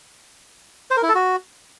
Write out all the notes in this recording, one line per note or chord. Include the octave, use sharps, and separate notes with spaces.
C5
A#4
E4
A4
F#4